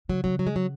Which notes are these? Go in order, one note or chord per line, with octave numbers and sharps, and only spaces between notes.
C#3 F#3
C#3 F#3
F#3
G#3
F#3